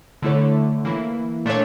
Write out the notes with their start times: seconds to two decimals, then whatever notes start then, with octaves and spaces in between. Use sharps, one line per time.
0.22 D3 A3 E4 A4 C#5
0.85 E3 A#3 E4
1.45 A#2 A3 D4 A4 C#5